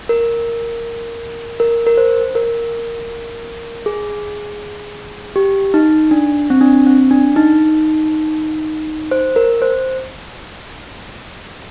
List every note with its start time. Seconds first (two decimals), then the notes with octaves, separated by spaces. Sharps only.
0.09 A#4
1.60 A#4
1.87 A#4
1.97 C5
2.35 A#4
3.86 G#4
5.36 G4
5.74 D#4
6.11 D4
6.50 C4
6.61 D4
6.86 C4
7.11 D4
7.36 D#4
9.11 C5
9.36 A#4
9.62 C5